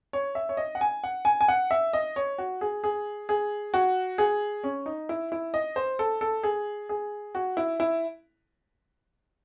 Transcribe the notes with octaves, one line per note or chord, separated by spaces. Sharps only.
C#5
E5
C#5
D#5
F#5
G#5
F#5
G#5
G#5
F#5
E5
D#5
C#5
F#4
G#4
G#4
G#4
F#4
G#4
C#4
D#4
E4
E4
D#5
C5
A4
A4
G#4
G#4
F#4
E4
E4